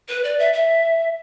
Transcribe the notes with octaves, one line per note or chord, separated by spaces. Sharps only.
B4
D5
E5
E5